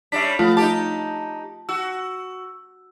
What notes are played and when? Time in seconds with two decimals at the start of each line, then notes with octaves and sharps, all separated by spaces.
0.12 G3 C#4 D4 E5 B6
0.39 F3 A3 B3 F4
0.57 D#4 G4 A5
1.69 F#4 E6